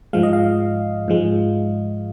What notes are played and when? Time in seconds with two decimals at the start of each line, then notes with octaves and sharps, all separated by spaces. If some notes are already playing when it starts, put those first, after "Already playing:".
0.13 G#2 F3 G#3 F5
0.23 D#5
0.33 F5
1.08 G#2 F3 G#3